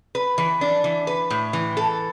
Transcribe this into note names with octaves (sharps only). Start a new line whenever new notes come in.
B4
E3
D4
E3
B4
A2
E3
A4